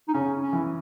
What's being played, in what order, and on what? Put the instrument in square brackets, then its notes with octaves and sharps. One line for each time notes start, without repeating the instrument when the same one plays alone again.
[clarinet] D#4
[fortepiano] C#3 [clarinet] C#4
[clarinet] C#4
[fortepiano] E3